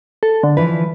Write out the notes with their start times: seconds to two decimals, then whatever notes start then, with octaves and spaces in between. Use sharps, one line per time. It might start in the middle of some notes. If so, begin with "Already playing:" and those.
0.23 A4
0.43 D3
0.57 E3 F3 B4